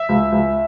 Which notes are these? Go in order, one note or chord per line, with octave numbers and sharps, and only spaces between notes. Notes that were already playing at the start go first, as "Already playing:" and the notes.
Already playing: E5
C#2
C#2